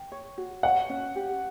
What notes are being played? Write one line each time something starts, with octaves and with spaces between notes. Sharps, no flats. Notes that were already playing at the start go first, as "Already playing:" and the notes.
Already playing: G5
C#5
F#4
C#5 F#5
C#4
G4